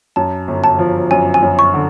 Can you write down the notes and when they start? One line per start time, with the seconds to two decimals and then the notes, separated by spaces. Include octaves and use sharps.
0.16 F#2 A5
0.48 G1
0.64 A5
0.79 F3
1.11 F#2 G#5
1.34 G#5
1.42 F#2
1.59 C#6
1.74 D3